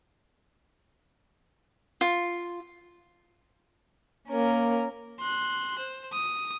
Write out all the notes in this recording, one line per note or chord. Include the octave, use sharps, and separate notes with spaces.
F4
A#3 C#4 A#4
C6 F#6
C5
D#6